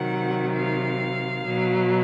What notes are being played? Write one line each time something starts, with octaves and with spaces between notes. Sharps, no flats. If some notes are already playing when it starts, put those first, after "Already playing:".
Already playing: C3 D#3 F#3 F#5
F5
B2 F#3